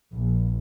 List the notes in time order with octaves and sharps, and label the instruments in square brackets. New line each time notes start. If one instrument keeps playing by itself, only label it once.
[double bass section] A#1